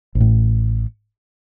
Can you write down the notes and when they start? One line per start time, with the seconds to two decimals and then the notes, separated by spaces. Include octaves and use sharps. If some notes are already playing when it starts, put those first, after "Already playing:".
0.15 A1
0.20 A2